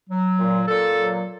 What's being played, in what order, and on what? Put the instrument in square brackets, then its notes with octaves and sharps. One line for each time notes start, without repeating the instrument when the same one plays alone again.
[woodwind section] F#3
A#2
A#2 A4
F#3